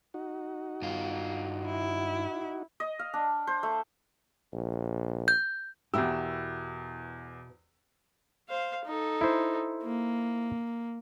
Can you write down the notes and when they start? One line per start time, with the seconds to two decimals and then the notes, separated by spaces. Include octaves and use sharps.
0.14 D#4 F#4
0.82 G2 F4
1.66 E4
2.80 D#5
2.99 F5
3.14 D4
3.47 C5
3.63 A3
4.53 A#1
5.28 G6
5.94 E2 B2 E4 F#4 G4 A#4 E6
8.49 C5 F5
8.86 D#4 A4
9.21 E4 C5
9.84 A#3